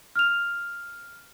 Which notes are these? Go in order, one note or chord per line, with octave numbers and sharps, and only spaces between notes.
F6 F7